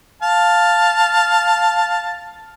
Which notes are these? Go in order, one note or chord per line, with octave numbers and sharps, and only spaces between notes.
F5 A5